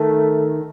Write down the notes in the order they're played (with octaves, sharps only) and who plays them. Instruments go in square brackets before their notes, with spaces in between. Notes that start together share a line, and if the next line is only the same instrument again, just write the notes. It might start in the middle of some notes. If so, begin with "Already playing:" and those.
Already playing: [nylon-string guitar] D#3 [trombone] A3